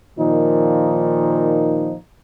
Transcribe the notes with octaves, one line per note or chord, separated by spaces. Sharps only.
A#2 D#3 F3 D#4